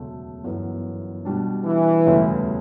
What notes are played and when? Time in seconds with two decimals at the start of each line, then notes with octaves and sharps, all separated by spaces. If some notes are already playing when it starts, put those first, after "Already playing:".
Already playing: E1 D2 C#3 F#3 A3
0.43 G1 F#2 E3 B3
1.25 B2 G3 D4
1.65 E3
2.06 E1 D2 C#3 G3